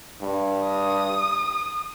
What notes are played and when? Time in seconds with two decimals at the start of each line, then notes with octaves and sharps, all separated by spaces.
0.22 G2
0.67 D#6